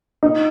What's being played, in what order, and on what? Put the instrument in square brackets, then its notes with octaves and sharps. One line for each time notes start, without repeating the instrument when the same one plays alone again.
[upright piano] D#4